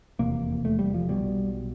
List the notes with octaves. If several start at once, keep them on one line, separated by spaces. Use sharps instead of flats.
F1 E2 C3 A#3
A3
G3
F3
B1 B2 G3